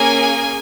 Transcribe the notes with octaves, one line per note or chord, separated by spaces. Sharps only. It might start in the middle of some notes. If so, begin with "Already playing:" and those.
Already playing: A#3 C#4 G#4 G#5